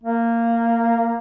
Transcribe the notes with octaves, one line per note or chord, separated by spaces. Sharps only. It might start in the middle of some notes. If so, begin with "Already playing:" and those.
A#3